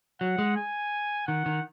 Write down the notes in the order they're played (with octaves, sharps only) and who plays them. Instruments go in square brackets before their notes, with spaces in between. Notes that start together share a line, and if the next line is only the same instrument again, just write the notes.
[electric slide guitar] F#3 [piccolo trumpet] F#5
[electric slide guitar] G#3
[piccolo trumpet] G#5
[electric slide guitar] D#3 [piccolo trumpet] F#5
[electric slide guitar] D#3